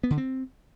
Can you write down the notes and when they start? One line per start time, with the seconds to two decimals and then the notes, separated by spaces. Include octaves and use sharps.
0.04 B3
0.11 D3
0.18 C4